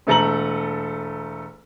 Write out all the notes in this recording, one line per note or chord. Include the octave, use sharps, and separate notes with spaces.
E1 A3 A4 A#5 F#7